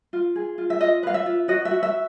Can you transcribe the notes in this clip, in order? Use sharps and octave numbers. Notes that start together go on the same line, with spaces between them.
F4
G#4
F4
E5
F4 D#5
B4 F5
E5
F4
F#4 D#5
E5
F#4
E5